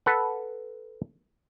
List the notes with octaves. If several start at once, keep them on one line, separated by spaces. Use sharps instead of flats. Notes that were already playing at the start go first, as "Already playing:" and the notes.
A4 B4 F#5